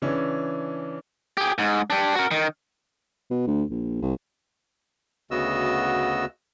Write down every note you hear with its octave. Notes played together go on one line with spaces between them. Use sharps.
C#3 E3 C#4 D4
G4 G#4
G#2
D4 G4
F#4 A#4
D#3
B2
D2
A#1
C2
D2 C#3 B3 F#4 D#5 E6